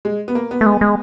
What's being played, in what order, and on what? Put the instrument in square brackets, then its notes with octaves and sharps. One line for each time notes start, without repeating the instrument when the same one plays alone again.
[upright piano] G#3
B3
A#3
B3
[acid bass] A3
G#3
G#3